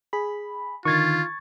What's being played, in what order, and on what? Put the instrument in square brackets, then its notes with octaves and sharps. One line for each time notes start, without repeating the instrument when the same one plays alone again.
[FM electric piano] G#4 B5
[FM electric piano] D3 D#3 [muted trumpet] F4 [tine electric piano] C#6 G#6 A6